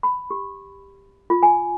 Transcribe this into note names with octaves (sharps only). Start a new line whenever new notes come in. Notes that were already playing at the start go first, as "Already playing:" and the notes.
B5
G4
F4
G#5